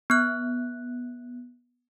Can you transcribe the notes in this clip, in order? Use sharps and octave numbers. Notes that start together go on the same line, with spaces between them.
B3 F#6